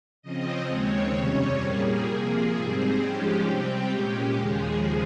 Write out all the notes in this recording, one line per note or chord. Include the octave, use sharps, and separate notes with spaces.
C#3 F3 C4 D#5
D#2 C#3 G#3 C4 C#5
F2 C3 G3 C#4
A#2 G3 A#3 G#4
C3 F3 A#3
G#2 G3 C4
G#2 F3 G#3 C#4 G4
C3 G3 C4 G4
A#2 G#3 C#4 G4
D#2 C#3 F3 G#3 G#4